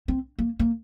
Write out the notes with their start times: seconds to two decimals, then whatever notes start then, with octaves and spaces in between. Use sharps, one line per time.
0.08 C4
0.39 A#3
0.59 A#3